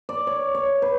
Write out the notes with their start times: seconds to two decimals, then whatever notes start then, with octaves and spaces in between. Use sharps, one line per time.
0.09 D5
0.27 C#5
0.55 C#5
0.82 B4